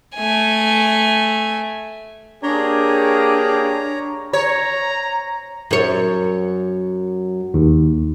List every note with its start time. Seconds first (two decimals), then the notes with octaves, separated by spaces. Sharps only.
0.16 A3 G#5
2.43 A#3 D4 G4 G#4 C#5 A#5
4.33 C#5 A#5
5.71 F#2 C#5
7.54 D#2